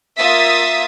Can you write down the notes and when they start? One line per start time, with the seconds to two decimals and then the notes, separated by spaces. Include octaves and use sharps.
0.18 A#3 F4 E5 D#6 A6 B6